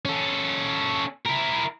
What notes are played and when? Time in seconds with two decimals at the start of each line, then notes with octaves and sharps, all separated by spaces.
0.05 C#4 A4
1.26 E4 A#4